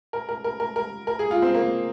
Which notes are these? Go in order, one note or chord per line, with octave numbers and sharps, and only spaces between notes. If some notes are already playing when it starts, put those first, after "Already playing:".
A#4
A#4
A#4
A#4
A#4
A#4
G#4
F4
C4
A#3